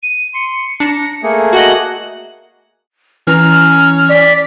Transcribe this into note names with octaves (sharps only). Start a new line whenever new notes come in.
D#7
C6 C#7
D4 A#5
A3 A#3 G#4
F#4 D#5 F#5
E3 C#4 A#5 F6
D5 B6